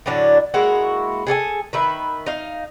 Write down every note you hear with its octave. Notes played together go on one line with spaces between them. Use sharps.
A2 D3 F#3 D4
G#3 A#3 E4 F#4
G#4 A4 D5 G#5
D#3 B4 E5
D#4 F5